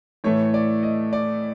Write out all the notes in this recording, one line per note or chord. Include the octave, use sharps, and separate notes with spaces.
A2 E3 A3 C#5
D5
D#5
D5